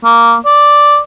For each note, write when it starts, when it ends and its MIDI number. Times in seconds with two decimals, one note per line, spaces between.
0.04 0.36 58
0.46 0.98 74